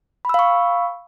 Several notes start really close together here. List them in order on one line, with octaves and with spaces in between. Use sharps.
B5 E6 F5 C#6